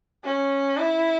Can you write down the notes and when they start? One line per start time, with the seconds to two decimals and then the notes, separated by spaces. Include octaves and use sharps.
0.24 C#4
0.77 E4